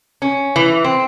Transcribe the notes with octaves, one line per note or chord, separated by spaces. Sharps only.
C#4
E3
C4